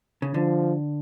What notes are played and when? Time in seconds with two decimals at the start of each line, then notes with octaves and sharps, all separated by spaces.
0.22 C#3
0.34 D3 F3